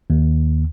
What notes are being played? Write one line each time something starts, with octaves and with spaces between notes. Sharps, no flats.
D#2